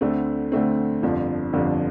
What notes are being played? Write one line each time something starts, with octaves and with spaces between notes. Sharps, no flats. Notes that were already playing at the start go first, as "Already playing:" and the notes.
D2 D3 A3 C4
D2 D3 A3 C4
G1 F2 D3 F3
G1 F2 D3 F3